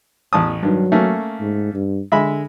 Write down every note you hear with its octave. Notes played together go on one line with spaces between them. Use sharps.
A1 E2 A5 D#6
G2 D#3 F#3
A3 A#3 C#4
G#2
G2
D3 G#3 E5 B5